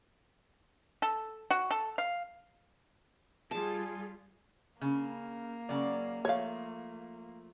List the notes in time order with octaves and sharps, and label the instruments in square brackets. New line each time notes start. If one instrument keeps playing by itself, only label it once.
[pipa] A4
F#4
A4
F5
[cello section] G3 F4 [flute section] G#4 [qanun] A5
[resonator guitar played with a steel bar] C#3 [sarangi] A#3
[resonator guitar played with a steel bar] C#3 F#3 D5
[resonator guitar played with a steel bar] F3 A3 [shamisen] C#5 F5